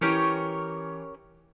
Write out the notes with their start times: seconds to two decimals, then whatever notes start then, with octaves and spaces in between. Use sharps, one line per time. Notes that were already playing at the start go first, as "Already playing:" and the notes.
0.01 E3 C#4 G4 A#4 C#5